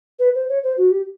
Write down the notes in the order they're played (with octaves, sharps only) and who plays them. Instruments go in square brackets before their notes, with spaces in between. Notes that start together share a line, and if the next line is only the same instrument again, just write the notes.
[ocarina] B4
C5
C#5
C5
F#4
G4